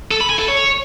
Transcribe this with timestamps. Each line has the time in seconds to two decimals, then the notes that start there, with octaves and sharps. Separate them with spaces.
0.11 A4
0.21 B5
0.30 G#5
0.39 A4
0.48 C#5